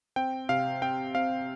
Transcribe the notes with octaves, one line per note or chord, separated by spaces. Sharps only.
C4 G5
C3 F5
C4 G5
C4 F5